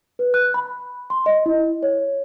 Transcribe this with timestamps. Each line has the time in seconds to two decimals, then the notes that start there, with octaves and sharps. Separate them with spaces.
0.19 B4
0.34 F#6
0.54 B5
1.10 C6
1.26 D#5
1.46 E4
1.83 C#5